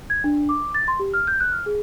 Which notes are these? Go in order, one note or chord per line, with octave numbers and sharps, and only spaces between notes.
G#6
D4
D6
A6
C6
G4
F6
G6
F#6
F6
G#4